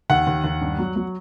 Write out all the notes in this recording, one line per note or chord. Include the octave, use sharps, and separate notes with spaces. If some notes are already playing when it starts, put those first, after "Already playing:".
D#2 F#5
D#2
D#2
G2
F#3
F#3